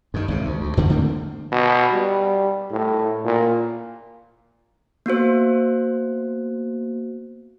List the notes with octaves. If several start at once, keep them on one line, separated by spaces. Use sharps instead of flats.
G2 D#3
G#1 G#2 C3
D2
D2
E2 D3 F3 G3
D3 A3 A#3 C4
B2
G3
A2
A#2
A#3 B3 F#4 C5